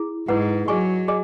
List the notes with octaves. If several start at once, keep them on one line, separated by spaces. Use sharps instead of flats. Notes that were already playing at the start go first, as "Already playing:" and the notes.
Already playing: E4 G#4
G#2 E4 G#4 B4 F#5
F#3 G#4 D#5 G#5 C#6
G#4 D#5 G#5